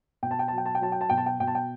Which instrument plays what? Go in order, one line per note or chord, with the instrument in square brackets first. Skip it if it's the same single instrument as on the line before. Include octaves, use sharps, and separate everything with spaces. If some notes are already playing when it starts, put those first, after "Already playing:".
[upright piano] B2 G5
A5
G5
A5
F#3
G5
A5
G5
F#3 A5
G5
A5
B2 G5
A5
G5
B2 G5
A5
G5